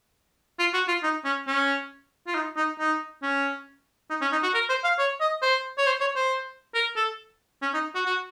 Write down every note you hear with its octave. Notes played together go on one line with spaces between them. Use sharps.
F4
F#4
F4
D#4
C#4
C#4
F4
D#4
D#4
D#4
C#4
D#4
C#4
D#4
F#4
A#4
C5
F5
C#5
D#5
C5
C#5
C5
C#5
C5
A#4
A4
C#4
D#4
F#4
F#4